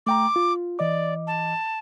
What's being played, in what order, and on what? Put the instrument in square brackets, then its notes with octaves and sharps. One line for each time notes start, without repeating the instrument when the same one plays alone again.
[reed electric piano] A3 G5 A#5 [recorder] D6
[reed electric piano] F4
[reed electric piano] E3 D#5 D6 [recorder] D5
[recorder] A5